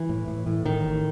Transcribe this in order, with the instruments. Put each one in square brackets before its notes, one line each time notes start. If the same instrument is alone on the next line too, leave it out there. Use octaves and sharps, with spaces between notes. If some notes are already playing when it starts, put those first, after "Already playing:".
Already playing: [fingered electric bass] E3
A2
A2
A2
A2 D#3
A1